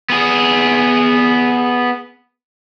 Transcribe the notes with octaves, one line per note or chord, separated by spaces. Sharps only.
B3 G#4